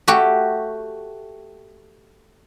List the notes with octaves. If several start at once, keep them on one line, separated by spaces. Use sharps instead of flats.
A3 F#4 G4